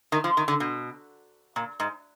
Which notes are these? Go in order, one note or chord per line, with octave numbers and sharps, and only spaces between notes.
D#3
F3
D#3
D3
B2
A#2
G#2